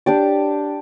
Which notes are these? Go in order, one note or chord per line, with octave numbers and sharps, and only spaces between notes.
D4 G4 D5